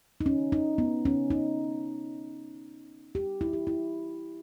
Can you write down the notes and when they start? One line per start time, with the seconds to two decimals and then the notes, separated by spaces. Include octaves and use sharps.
0.21 D#4
0.26 C#4
0.52 D#4
0.78 B3
1.05 C#4
1.30 D#4
3.15 G4
3.41 E4
3.53 G4
3.67 E4